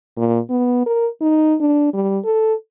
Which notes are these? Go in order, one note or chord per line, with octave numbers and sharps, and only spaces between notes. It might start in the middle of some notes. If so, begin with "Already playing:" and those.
A#2
B3
A#4
D#4
D4
G3
A4